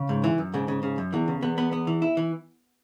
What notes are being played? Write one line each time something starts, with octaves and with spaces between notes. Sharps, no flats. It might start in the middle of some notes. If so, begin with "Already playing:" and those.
Already playing: C#3
G#2
E3
F#2
G#2 C#3
C#3
C#3
F#2
E2 E3
C#3
E2 B3
B3
B3
E3
E4
E3